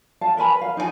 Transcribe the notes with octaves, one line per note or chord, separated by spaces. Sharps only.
F5 A5
A#4 B4 G#5 B5
F5
D#4 G#4 C5 G#5